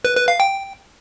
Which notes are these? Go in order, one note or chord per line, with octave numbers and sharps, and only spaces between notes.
B4
B4
F5
G5